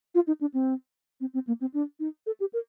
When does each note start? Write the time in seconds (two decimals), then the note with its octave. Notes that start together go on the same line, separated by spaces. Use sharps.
0.15 F4
0.27 D#4
0.41 D4
0.54 C4
1.21 C4
1.34 C4
1.47 A#3
1.61 C4
1.74 D4
2.00 D#4
2.26 A4
2.40 G4
2.53 A#4